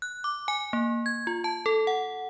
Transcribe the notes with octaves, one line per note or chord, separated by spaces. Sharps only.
F#6
D6
G#5
A#3
G#6
F4
A5
A4
F#5